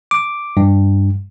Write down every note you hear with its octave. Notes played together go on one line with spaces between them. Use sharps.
D6
G2